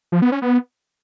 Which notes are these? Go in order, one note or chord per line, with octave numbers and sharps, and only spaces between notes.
F3
B3
C#4
B3